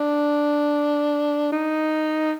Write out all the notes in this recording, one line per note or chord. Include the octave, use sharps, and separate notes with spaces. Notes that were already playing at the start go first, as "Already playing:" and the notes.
Already playing: D4
D#4